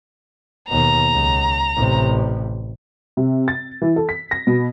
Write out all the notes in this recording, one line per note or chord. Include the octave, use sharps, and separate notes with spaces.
D#2 B2 A#5
C#2
A1 C3
C3
A6
E3
A4
B6
A#6
B2